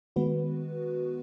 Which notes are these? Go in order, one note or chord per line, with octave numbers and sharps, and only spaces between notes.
D#3 G#3 B3 F#4 B4